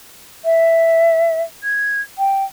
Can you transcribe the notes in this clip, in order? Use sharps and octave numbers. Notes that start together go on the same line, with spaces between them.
E5
G#6
G5